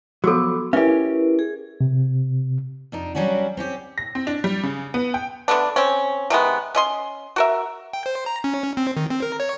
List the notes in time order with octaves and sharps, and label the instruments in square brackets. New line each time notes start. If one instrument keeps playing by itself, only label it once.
[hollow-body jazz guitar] F3 F#3 [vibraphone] B3 D6 E6 [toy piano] F#4 A4
[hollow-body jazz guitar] C#4 G4 [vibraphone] E4 A#4 B4 [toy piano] E5
[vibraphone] G#4
[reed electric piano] C3
[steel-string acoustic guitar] F2 D4 D#4
F#3 G3 C#4 D4 F#4
C4 C#4 G4
[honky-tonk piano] A#6
C4
D4
G3
C#3
B3
G5
[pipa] D3 A3 B3 D4
C4 C#4
C3 D#3 G#3 B3
C#4 D#5 C6
F#4 A#4 E5
[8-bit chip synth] G5
C5
A#5
C#4
C4
D#3
C4
A#4
C#5